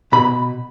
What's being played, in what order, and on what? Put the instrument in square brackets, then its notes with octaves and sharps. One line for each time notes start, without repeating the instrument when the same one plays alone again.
[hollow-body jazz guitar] B2 B5